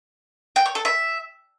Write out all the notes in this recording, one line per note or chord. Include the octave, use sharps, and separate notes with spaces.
G5
C#5
A4
E5